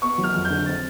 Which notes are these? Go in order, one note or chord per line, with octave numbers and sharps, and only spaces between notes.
B3 C#6
F#3
F6
F2
G6
D3
C4 A6